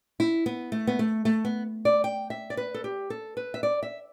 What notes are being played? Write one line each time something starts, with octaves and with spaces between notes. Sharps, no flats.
E4
B3
A3
B3
A3
A3
B3
D5
G5
E5
D5
B4
A4
G4
A4
B4
E5
D5
E5